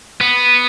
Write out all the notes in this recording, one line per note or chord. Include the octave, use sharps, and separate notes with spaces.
B3